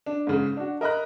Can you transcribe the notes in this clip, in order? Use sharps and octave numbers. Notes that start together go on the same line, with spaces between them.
D4
G#2 C#3
D4 F#4
A#4 D#5 A#5 B5 F#6